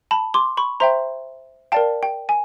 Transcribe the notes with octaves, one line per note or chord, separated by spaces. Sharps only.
A5 B5
C6 D6
B5 C#6
C5 E5 G5 A#5 C6
A#4 D5 F5 G5 A5
G5
G#5